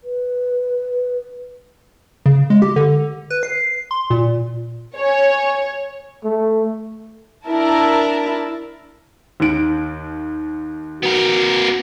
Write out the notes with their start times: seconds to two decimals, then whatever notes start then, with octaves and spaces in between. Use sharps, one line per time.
0.04 B4
2.26 C#3
2.50 G#3
2.62 G4
2.76 D3
3.30 B4
3.43 C7
3.91 C6
4.10 A#2
4.98 C#5 G#5
6.24 A3
7.47 D4 E4 A#4 A5
9.40 D#2 D#3 D7
11.03 B3 F#4 A#4